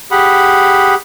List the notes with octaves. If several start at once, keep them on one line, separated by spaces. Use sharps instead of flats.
G4 G#4 F#5 B5